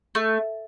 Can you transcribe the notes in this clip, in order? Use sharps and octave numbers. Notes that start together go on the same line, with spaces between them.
A3